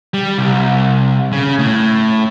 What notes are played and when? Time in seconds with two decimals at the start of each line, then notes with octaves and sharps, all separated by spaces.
0.14 G3
0.38 C2
1.33 C#3
1.59 A2